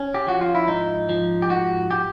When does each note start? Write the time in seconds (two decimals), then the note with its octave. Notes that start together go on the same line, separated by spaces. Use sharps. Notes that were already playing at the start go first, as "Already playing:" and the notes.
Already playing: C#4
0.14 G4
0.27 F3 F#4
0.41 F4
0.55 E4
0.68 G#2 D#4
1.09 F3
1.42 G4
1.49 G#2 F#4
1.91 G4